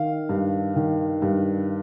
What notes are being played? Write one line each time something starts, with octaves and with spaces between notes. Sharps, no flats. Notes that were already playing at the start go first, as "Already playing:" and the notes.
Already playing: D#3 F5
G2
D#3
G2